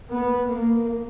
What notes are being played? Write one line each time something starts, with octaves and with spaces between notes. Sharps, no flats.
B3
A#3